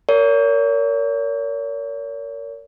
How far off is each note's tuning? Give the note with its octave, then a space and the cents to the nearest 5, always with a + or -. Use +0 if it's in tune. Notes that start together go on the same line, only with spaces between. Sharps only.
A#4 -15 C#5 +40